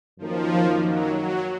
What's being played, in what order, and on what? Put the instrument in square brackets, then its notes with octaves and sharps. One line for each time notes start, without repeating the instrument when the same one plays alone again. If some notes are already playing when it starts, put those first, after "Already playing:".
[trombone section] F#2 D#3 A#3 [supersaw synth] F3
[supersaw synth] F#3
F#3